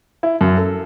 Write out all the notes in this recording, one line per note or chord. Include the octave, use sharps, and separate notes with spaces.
E4
F#2
A4